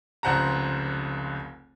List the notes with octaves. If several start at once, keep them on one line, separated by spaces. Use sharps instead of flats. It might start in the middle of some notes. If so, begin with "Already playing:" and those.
F1 C#2 C5 F#5 A5 A#5